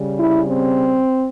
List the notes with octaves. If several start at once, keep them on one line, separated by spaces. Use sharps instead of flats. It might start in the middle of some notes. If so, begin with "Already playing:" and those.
Already playing: C#3 G3
E4
C4